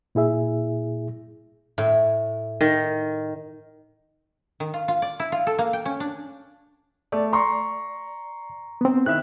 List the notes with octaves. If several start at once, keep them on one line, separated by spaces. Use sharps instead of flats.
A#2 E4 G#4 E5
A2
D#3
D#3
F4
F4
D5
E4
F4
A4
A#3
G5
C#4
D4
A3 D5
A#5 C6 C#6
B3 C4
D#3 E4 E5 F#6